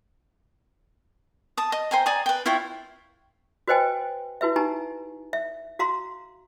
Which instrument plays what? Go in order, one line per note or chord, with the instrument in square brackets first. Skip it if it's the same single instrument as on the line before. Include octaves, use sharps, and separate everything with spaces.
[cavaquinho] A5 D#6
D#5
C5 G5 G#5 A#5
D5 G#5 A#5 D#6
B4 G5
E4 F4 C#5 G5
[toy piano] F#4 B4 C5 D#5 G5 G#5
E4 F#4 B4 E5
D#4 G4 G#5 A#5
E5
F#4 F5 A#5 C6